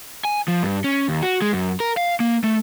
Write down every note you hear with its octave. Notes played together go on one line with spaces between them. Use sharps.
G#5
F3
G2
C#4
D#2
F#4
G#3
F#2
A#4
F5
A#3
A3